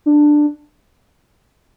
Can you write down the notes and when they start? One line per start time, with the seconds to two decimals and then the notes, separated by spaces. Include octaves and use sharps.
0.06 D4